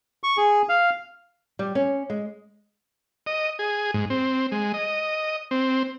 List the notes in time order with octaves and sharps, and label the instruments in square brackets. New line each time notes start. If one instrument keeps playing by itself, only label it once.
[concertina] C#6
G#4
F5
[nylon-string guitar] G3
C#4
G#3
[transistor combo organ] D#5
G#4
G#2
C4
G#3
D#5
C4